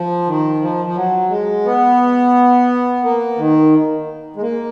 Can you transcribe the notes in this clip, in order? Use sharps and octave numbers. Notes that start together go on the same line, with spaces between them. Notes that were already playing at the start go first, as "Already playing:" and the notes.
Already playing: F3
D#3
F3
F3
F#3
G#3
B3
A#3
D#3
G#3
A#3